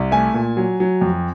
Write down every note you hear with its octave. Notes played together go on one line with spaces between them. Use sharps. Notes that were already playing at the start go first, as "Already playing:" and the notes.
Already playing: C2
A3 G#5
A#2
F#3
F#3
F2